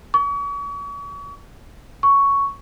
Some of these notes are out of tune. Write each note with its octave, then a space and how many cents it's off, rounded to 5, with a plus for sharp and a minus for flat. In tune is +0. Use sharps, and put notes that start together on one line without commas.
C#6 +40
C#6 +5